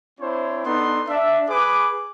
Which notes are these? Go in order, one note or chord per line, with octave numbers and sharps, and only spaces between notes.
C4 D4 E4 C5 C#5
B3 D4 D#4 A4 C6
D4 E5
G#4 B4 D6